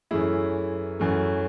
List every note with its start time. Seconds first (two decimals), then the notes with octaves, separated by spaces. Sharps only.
0.11 F#2 E3 A3 E4 G#4
1.00 F#2 E3 A3